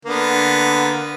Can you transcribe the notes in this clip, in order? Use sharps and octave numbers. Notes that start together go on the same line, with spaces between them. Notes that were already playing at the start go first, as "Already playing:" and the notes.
D3 A#3 B3